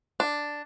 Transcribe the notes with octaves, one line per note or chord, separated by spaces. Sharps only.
D4